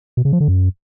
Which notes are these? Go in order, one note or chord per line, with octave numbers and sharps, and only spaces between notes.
B2
C#3
F3
D3
F#2